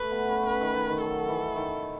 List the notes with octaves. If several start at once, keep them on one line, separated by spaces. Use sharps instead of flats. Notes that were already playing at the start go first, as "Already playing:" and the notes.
Already playing: A3 B4
B3
C#4
B4
D#3
D#3
D#3
F#3 A4
E3
D#3